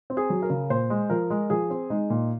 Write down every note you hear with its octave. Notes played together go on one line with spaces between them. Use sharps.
C4
G#4
F#3
A#4
C#3
A#2 C5
G#3
F3 A#4
G#3
F3 G#4
C4
G#3 D#4
A#2